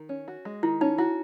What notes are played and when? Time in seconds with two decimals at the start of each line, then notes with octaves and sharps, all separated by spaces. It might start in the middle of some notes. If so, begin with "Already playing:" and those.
Already playing: D#3
0.09 C#4
0.28 F#4
0.45 G#3
0.63 D#3 E4
0.81 C#4 D#4
0.98 E4 F#4